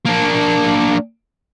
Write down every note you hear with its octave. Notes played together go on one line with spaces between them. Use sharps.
A#3 D4